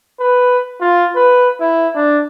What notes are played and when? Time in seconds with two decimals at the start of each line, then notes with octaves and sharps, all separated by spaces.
0.20 B4
0.81 F4
1.16 B4
1.60 E4
1.96 D4